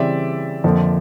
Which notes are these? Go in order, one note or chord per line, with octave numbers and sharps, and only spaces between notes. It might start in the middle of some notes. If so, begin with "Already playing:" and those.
Already playing: C#3 E3 G3 C4 D5 E5
F2 D3 F3 A#3